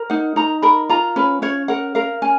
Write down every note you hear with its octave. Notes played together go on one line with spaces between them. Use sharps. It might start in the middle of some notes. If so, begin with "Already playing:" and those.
Already playing: A#4
D#4 F#5
D#4 A#5
A#4 B5
F4 A#5
C#4 B4
C#4 C#5
A#4 F#5
A#4 F5
C#4 G#5